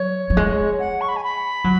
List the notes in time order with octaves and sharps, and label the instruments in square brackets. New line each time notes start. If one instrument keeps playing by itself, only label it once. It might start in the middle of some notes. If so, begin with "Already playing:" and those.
Already playing: [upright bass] F#3 [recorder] C#5
[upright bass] F#3
G#3
[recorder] F#5
C#6
B5
G#5
B5
[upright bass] F#3